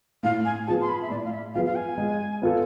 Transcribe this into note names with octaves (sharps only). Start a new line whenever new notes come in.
A2 F5
G#5
F3 B3 F4 G#4 A5
C6
B5
E5
A2 D5
F5
E5
F3 B3 F4 G#4 F5
F5
G#5
G#3
B3 F4 A4